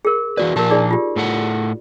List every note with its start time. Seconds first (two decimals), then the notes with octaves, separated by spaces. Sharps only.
0.05 G#4 A#4
0.37 E3 F#4 B4 D5
0.56 A#2 F3 G4 A#4 A5
0.70 D#4 G#4 D5
0.91 F4 G4
1.16 A2 A4 F#5